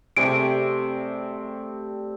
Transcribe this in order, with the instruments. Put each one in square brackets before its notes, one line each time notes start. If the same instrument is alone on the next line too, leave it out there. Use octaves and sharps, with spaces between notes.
[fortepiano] C3 G#4 [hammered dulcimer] G3 A3 C4 [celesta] D7